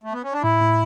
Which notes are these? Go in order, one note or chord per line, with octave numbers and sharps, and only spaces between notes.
A3
B3
C#4
D4
A2 E4
A2